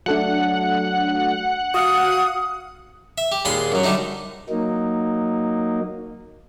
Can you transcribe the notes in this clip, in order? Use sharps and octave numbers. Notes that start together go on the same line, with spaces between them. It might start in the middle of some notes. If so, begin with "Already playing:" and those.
F#3 A3 D4 F#5
F#4 F5 D#6 C#7
E5
G4
D#2 A#2 G#3 B5 C6 D#6
F#2 F#3
D3 G3 A3 D#4
F#3 A#3 D#4